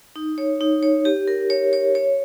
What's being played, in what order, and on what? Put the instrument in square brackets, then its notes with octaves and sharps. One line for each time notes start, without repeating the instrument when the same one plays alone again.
[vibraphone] D#4
C#5
D#4
C#5
G4
A#4
C#5
C#5
C#5